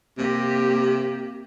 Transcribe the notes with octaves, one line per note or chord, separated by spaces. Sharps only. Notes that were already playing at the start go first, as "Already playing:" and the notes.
C3 A#3 G4